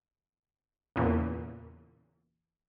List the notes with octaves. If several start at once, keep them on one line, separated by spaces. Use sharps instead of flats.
E2 A#2 C#3